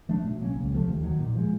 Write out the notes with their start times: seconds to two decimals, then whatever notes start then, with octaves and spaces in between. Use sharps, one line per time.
0.09 F3 A3 D4
0.24 B2
0.41 F#3 A#3 C#4
0.56 C#2
0.72 C3 F3 A3
0.88 D#2
1.03 D#3 F#3
1.19 A#2
1.35 F3 G#3